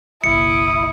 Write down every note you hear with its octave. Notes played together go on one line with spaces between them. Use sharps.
F#1 B1 E4 D#6 C#7